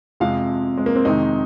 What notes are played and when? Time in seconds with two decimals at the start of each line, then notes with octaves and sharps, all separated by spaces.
0.20 F2 C3 F3 G#3 F5
0.78 G#3
0.86 A#3
0.96 C4
1.05 F2 C3 D#3 G#3 D#4